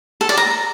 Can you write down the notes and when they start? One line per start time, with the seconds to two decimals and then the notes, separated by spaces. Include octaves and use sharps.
0.21 A4
0.29 D5
0.37 A#5